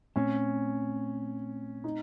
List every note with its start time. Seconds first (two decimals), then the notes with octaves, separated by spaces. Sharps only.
0.16 A#2 A3 C4 C#4
1.84 D#4